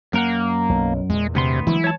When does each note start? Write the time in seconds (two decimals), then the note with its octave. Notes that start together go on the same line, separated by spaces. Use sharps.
0.13 F#2 A#3 A#4 F#5
0.69 B1
1.10 E2 A#2 G#3
1.35 D2 C3 B3 C6
1.67 E3 F#3 G#3 E4
1.84 C#5 A5